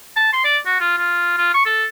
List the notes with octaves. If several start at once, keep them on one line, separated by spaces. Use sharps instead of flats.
A5
C6
D5
F#4
F4
F4
F4
C#6
A4